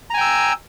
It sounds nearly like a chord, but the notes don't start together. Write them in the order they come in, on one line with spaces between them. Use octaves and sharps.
A#5 G#5 G5 E6